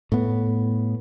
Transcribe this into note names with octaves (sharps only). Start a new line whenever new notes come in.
A2 B3